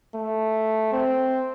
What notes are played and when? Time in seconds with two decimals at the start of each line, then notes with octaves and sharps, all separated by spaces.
0.16 A3
0.93 C4